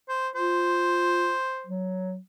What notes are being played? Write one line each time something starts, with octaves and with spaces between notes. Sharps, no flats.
C5
F4 C5
F#3